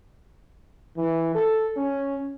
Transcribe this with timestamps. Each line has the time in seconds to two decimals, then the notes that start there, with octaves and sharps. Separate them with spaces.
0.97 E3
1.35 A4
1.77 C#4